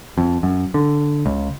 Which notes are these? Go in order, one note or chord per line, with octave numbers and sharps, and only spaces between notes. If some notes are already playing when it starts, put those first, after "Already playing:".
F2
F#2
D3
C#2